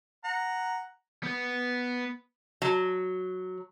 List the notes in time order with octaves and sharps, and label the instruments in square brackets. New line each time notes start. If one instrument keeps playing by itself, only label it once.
[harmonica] F#5 A#5
[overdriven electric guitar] B3
[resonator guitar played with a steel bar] F#3